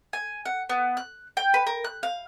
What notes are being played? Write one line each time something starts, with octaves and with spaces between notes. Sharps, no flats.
G#5
F#5
B3
F#6
G5
B4
A#4
F#6
F5